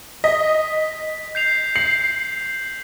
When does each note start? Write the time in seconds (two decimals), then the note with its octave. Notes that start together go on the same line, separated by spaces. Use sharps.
0.24 D#5 B6
1.35 G6 C7 F7
1.76 C7 F#7